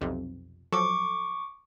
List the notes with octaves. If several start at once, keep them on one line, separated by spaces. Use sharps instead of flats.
B1 F2 C3
F3 F#3 A4 C#6 D6